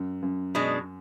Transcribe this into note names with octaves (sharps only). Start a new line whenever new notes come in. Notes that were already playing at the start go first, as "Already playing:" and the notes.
Already playing: F#2
F#2
B2 G#3 D4